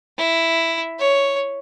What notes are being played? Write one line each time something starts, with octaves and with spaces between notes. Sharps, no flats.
E4
C#5